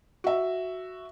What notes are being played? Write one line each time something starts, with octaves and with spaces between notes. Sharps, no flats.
F#4 E5